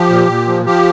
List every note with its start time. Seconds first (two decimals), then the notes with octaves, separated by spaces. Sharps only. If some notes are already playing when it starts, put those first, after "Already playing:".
Already playing: F3 G4
0.09 A#2
0.28 A#2
0.47 F3
0.65 F3 G4